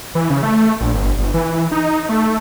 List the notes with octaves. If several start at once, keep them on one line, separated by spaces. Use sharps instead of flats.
E3
C#3
A3
A#1
G1
G1
E3
D#4
A3